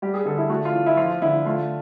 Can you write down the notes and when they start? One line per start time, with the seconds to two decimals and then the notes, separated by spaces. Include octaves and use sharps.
0.02 G3 G4
0.14 G#4
0.25 D3 A4
0.38 E4
0.49 A3 F#4
0.65 F4
0.73 E3
0.86 E4
0.97 F3 F4
1.22 D3 E4
1.46 A3 F4